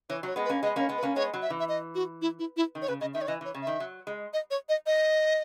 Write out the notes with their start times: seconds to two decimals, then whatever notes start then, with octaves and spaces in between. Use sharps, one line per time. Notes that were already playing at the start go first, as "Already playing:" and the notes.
0.10 E3 C#5
0.23 F#3
0.28 C#5
0.36 G#3 B3
0.45 B4
0.49 A#3 C#4
0.63 G#3 B3 D#5
0.76 A#3 C#4 C#5
0.89 G#3 B3
0.98 B4
1.03 A#3 C#4
1.16 G#3 B3 C#5
1.34 F#3
1.42 E5
1.50 E3
1.59 E5
1.69 D#5
1.95 F#4
2.22 E4
2.39 E4
2.57 E4
2.75 D#3
2.82 C#5
2.88 C#3 B4
3.01 C#3 D#5
3.14 D#3 E5
3.21 C#5
3.28 E3 D#5
3.41 E3 C#5
3.54 C#3
3.62 D#3 E5
3.80 F#3
4.07 G#3
4.33 D#5
4.51 C#5
4.69 D#5
4.86 D#5